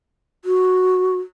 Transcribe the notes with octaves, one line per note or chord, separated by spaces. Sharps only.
F#4